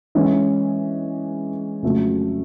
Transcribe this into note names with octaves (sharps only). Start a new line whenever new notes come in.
E3 G#3 C#4
F2 C#3 F#3 A3